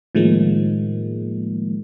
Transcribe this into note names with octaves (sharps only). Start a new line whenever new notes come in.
A2 D#3 F3 G#3 A#3